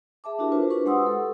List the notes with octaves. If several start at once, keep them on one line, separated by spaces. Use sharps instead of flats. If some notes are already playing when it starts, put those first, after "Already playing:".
G#4 E5 A5 D6
D4 E4 F#4 G4 A#4
F4 B4 C5
D4 B4 C#6
G#3 G4 F#5 C6 D#6 E6
A4